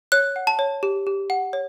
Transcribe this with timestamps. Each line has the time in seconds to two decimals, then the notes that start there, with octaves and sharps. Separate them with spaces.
0.12 C#5 F#6
0.36 F#5
0.47 A5
0.59 C#5
0.83 G4
1.07 G4
1.30 F#5
1.53 C#5